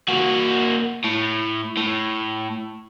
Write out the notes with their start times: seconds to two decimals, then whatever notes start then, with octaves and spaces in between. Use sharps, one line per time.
0.09 A#3 F#4
1.04 A2
1.77 A2